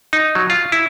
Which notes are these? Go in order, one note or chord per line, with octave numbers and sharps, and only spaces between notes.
D#4
F#3
F4
E4